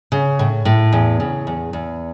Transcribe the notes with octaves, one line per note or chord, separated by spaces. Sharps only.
C#3
A2
A2
E2
C#3
E2
E2